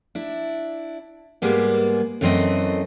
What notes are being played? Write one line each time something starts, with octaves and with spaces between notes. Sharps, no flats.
D4 E4
G#2 G3 G#3 A#3 B3
F#2 E3 A3 C4 C5 D#5